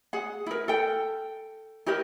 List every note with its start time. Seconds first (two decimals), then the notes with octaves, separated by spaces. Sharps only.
0.13 G#4 F#5
0.46 E4 A#4
0.68 A4 G5
1.86 E4 G4 A#4 D#5